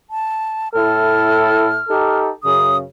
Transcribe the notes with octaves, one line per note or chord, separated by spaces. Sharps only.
A5
A2 E4 A4 F6
D#4 G4 A4
F#2 C#3 D#6